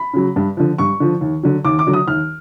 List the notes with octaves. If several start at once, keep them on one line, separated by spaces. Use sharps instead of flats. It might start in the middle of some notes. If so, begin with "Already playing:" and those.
Already playing: B5
C#3 F#3
G2
D3 F3
G2 C#6
D3 F3
D#2
D3 F#3
D#2 D6
D6
D3 F#3
D#6
D#2 F6